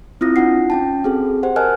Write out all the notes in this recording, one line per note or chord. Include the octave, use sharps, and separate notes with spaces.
C4 E4 F4 D#6 A#6
D4 D#4 F4 F#5 C7
C#4 G5 A5
C4 F#4 G#4 A4
G4 C5 F#5
A#4 D#5 G#5 A5 F6 F#6